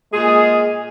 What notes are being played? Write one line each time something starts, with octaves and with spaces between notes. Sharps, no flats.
A#2 G#3 G#4